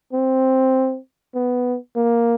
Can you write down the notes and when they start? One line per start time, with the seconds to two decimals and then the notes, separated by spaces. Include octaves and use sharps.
0.13 C4
1.35 B3
1.96 A#3